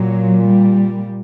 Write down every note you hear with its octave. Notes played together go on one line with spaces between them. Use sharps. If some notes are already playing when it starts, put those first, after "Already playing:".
Already playing: A#2 F#3
G3